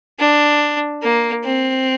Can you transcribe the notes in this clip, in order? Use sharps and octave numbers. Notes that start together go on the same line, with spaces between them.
D4
A#3
C4